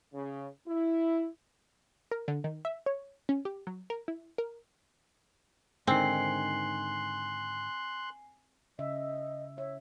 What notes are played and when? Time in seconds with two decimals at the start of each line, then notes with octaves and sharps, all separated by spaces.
0.13 C#3
0.68 E4
2.11 A#4
2.28 D3
2.44 D#3
2.65 E5
2.86 C#5
3.29 C#4
3.45 G4
3.67 F#3
3.90 A#4
4.08 E4
4.38 A#4
5.87 G#2 D3 D#3 C4 G#5 C6 F#6 C7
8.79 C#3 D#5 E5
9.58 C#5 E5